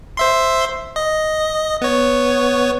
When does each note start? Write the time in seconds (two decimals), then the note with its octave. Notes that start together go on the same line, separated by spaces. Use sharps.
0.17 C5 E5 C6
0.96 D#5
1.81 B3 C#5